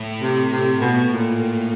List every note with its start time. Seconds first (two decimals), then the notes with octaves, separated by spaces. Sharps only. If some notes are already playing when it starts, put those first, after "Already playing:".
Already playing: A2
0.22 C3
0.51 C3
0.81 B2
1.11 A#2